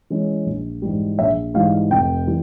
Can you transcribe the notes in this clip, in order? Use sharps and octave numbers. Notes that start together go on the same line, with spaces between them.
E3 G#3 C#4
A#1
G#2 E3 G3
A#1 E5
G#2 E3 G3 F5
F1 G5
E3 G3